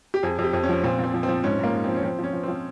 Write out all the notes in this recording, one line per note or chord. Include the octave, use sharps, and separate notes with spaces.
G4
F2 G#4
F2
G4
F2
C#4
F3
A#2 C4
A#2 C4
F3
C4
F3
G#2 C#4
G#2 A#3
G#2
F3 C4
C#4
F3 C4
F3
C#4
F3
F3 C4